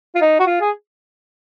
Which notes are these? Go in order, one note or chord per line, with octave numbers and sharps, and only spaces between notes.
F4
D#4
F#4
F4
G#4